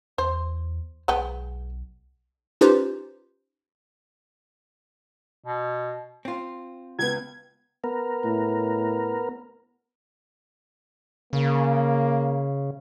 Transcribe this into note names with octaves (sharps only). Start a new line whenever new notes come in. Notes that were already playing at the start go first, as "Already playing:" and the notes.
E2 C5
B1 G#3 B3 G5
C#4 D#4 F4 G4 B4 C5
B2
C4 F4
C#2 B3 G#6
B3 A#4
A2
C#3 A#3